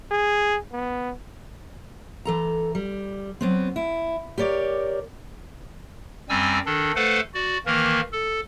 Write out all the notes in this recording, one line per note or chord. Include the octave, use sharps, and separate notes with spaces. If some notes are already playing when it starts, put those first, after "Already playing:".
G#4
B3
E3 A4 A#5
G3
F#3 B3 C4
E4
G4 A#4 C#5 D5
F#2 G3 C4 G#5 E6
D#3 D4 A4
A3 A4 B4 C5 F5 F#5
F#4 D5
D#3 E3 A#3 A#4
A4